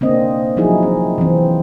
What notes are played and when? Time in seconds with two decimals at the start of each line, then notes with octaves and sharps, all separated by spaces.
0.01 A#3 C4 D4 D#5
0.57 F3 F#3 D#4 E4 G#4
0.83 C4
1.18 E3 C4